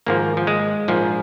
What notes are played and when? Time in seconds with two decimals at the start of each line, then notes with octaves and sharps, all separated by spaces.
0.06 G#1 G#2 F3 A#3
0.37 F3
0.47 G#3
0.88 A#1 G#2 F3